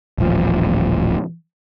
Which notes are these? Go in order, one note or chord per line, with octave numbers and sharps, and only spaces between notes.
D#1 A1 F3